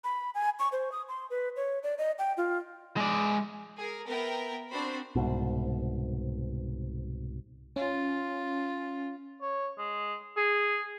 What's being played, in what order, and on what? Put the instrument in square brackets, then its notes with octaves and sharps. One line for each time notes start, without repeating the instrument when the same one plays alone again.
[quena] B5
G#5
C#6
C5
D#6
C6
B4
C#5
D5
D#5
G5
F4
[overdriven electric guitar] G#3 D5
[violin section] G#4 A#4
B3 A#4 E5 G5
C4 D4 F#4 C5 B5
[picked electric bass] C2 G#2 B2
[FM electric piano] C#4 [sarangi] F4
[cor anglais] C#5
G#3
G#4